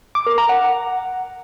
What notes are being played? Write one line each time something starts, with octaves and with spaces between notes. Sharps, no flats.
D6
A#4
A#5
F#5